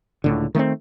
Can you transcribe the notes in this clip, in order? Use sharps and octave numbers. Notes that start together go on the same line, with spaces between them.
C#2 A2 D3
D#3 A3 A#3 C4